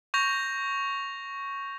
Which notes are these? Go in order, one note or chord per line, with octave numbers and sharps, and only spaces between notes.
C#6 G6 A#6 F7